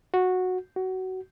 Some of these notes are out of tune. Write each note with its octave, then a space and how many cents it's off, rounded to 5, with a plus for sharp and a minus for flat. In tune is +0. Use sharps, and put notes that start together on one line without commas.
F#4 -10
F#4 +20